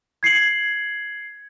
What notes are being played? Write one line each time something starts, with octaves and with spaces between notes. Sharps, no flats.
G#6 C7 C#7 F#7